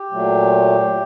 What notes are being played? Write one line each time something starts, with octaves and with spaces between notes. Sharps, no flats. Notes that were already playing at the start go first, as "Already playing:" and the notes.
Already playing: G4
A#2 F#3 A3